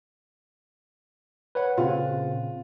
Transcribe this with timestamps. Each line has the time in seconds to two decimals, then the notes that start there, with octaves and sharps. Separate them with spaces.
1.55 B4 C#5 F#5
1.77 A#2 C#3 C4 F4